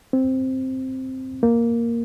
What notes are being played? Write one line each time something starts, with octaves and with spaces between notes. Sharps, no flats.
C4
A#3